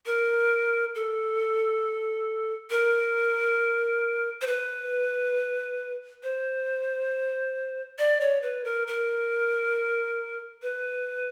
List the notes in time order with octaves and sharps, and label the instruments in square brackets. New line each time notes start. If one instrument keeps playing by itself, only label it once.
[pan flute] A#4
A4
A#4
C5
B4
C5
D5
C#5
B4
A#4
A#4
B4